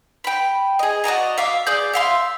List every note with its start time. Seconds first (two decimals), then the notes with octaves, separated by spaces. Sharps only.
0.24 G5 B5
0.79 G#4 D#5
1.04 F#4 D5 D#5 A#5
1.38 E5 F5 D6
1.67 G#4 D5 D6 G6
1.93 E5 F5 C6